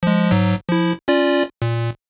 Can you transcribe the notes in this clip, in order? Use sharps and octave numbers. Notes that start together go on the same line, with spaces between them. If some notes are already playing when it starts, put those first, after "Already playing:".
F3 G#3
G#2 F#3
F3 E4
C#4 F4 D5
A#2